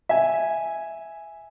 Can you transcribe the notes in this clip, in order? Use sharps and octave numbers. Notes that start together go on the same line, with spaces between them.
E5 G#5